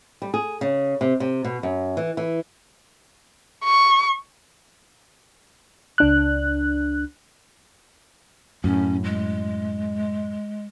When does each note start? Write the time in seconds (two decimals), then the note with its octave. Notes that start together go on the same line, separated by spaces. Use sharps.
0.22 G3
0.34 G#4
0.61 C#3
1.01 C3
1.20 C3
1.44 B2
1.63 F#2
1.97 E3
2.17 E3
3.65 C#6
5.98 C#2 D4 F#6
8.64 F#2 A2 C#4
9.04 G#3